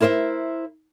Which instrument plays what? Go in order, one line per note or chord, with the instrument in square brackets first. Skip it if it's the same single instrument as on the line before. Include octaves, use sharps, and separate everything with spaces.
[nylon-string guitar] E4 A#4 C5 D5 E5